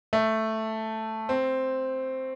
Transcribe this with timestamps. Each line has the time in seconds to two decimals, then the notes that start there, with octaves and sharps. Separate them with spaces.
0.13 A3
1.29 C4